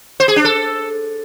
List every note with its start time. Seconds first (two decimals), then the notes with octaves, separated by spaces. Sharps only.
0.20 C5
0.28 G#4
0.36 D4
0.44 A4